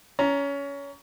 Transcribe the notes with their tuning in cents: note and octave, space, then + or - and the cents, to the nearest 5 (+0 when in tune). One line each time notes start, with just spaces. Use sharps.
C#4 +20 A#5 +0